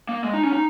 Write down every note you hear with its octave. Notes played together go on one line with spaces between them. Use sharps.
A#3
G#3
D#4
C#4
D#4